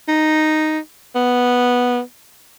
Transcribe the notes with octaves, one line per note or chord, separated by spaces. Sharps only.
D#4
B3